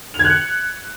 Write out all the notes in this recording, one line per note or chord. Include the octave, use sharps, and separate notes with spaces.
F7
G#6
F#6
C#7